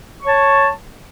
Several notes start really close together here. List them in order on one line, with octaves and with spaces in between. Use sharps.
C#6 C#5 A5